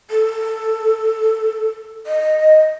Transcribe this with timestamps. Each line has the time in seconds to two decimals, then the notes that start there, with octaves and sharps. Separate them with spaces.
0.11 A4
2.07 D#5